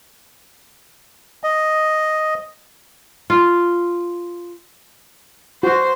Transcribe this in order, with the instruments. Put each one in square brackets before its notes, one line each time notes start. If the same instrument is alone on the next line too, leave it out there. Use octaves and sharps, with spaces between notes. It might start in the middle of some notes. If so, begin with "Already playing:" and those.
[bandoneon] D#5
[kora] F4
[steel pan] F#4 [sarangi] C5